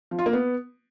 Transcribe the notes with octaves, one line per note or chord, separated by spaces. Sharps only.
F3
F4
A#3
B3